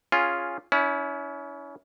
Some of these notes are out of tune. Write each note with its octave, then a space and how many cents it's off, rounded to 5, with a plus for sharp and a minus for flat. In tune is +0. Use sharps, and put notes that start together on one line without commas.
C#4 +0 F4 +0 G#4 +0
C#4 +30 E4 -20